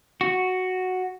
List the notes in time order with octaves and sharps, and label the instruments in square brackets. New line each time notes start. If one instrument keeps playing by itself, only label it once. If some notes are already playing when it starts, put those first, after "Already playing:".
[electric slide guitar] F#4